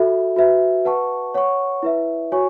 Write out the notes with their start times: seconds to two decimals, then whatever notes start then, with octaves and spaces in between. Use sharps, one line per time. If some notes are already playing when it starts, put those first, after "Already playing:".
Already playing: F#4 A4 E5 B5
0.36 F#4 B4 E5
0.85 B4 F#5 A5 C#6
1.34 C#5 F#5 C#6
1.83 E4 B4 E5
2.32 F#4 C#5 G#5 C#6